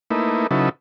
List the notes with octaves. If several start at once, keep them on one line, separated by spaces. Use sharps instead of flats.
A3 A#3 D#4 E4 B4
C#3 F#3 D#4 E4 A4 B4